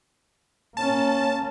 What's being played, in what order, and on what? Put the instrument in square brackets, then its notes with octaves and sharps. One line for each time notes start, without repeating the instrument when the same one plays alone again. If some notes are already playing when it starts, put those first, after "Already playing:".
[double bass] A#3 C#4 [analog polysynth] A5